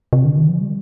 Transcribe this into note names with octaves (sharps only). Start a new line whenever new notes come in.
C3
D3
D#3
F3
G3